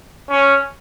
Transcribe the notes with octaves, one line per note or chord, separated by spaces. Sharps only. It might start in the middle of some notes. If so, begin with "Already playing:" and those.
C#4